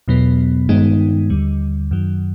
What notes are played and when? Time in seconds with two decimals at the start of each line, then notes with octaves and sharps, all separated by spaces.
0.08 E2 B2 F#3 B3
0.69 G2 D#3 G#3 B3 D#4
1.30 D#2 D3 G3
1.91 F#2 D#3 F#3